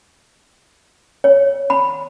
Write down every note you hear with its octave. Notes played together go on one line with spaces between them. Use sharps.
C#5
B5